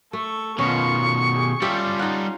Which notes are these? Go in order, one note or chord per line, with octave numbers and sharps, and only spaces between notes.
A3 A4 C#6
B2 D#3 B3 C#4 F4 C#6
G4 G#4
G3 C#4 F4 G4 A4 E5
D#4 F#5